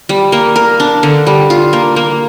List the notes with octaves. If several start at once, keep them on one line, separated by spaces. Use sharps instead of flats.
G3
A#3
A#4
D4
D3
G3
F4
A#3
A#3